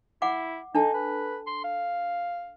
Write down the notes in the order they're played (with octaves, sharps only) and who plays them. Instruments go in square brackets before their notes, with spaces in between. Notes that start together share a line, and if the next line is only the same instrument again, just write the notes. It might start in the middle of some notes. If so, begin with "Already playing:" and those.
[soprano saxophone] E4 [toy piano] F#5 D6
[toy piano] D4 A4 A5 [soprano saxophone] D#4
[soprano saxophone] B4
C6
F5